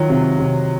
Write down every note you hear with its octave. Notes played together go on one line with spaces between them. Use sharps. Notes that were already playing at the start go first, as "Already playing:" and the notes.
Already playing: D#3 F#3 F4
C3
C3